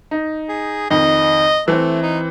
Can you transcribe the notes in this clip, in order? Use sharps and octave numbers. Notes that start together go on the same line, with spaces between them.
D#4
G#4
F2 D#3 D#5
E3 A3 C4
D#4